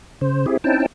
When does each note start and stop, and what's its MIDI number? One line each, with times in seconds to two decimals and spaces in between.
0.21 0.46 49
0.21 0.46 72
0.46 0.57 60
0.46 0.57 64
0.46 0.57 67
0.46 0.57 68
0.64 0.86 60
0.64 0.86 61
0.64 0.86 63
0.64 0.86 64
0.64 0.86 79
0.64 0.86 81